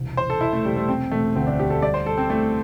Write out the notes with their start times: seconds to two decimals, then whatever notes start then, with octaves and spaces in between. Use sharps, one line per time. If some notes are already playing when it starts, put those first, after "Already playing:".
Already playing: E1 C2
0.17 E3 C5
0.30 A4
0.41 E3 E4
0.53 A3
0.65 E1 G3
0.76 A3
0.88 C3 C4
1.11 E1 A3
1.35 D2 C4
1.47 D4
1.59 D2 G4
1.70 A4
1.82 G3 D5
1.94 C5
2.06 G3 A4
2.17 C4
2.30 A3 E4